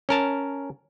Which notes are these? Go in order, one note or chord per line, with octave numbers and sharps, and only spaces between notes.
C#4 A#4 A5